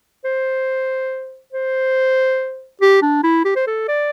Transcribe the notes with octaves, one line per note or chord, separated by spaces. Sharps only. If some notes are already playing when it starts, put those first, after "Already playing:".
C5
C5
G4
D4
E4
G4
C5
A4
D5